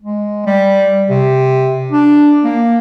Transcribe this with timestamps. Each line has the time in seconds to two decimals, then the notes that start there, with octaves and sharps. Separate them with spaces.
0.02 G#3
0.46 G3
1.10 C3
1.92 D4
2.44 A#3